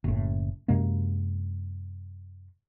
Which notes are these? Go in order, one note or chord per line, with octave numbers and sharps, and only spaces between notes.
F#1 A2
F#2 C3 G#3 A#3